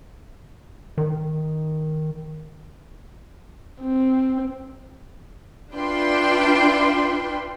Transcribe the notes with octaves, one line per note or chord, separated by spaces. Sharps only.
D#3
C4
D4 F4 B4 E5 G5 C6